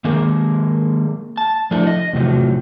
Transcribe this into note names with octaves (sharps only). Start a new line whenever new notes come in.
D#3 G#3 A#3 G#4 A#4
A5
F3 A3 D4 E4
D#5
E2 A2 C3 F3 F#3